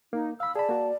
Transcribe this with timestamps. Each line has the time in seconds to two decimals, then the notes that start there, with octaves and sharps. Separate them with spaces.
0.13 A#3 D#4
0.40 F5 B5 E6
0.56 G#4 D5 A5 B5
0.69 A#3 F#4